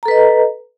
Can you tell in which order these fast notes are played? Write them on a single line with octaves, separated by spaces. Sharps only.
A#5 A4 B4 D#5